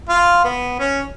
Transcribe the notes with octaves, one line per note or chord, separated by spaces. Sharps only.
F4
B3
C#4